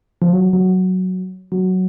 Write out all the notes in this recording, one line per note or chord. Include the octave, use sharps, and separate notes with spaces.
F3
F#3
F#3
F#3